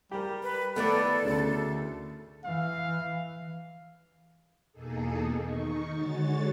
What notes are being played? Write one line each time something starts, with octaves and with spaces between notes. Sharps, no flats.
G3 G4 A#4
B4
D#3 A3 B3 D4 E4 A4 D5
D2 C#3
E3 F5
E2 B2 A#3 D#4 G#4 A4
D#3 D#4 C#6
D3 G#3 F#4 C#5 A6